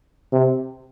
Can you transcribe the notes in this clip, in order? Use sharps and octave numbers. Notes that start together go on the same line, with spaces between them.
C3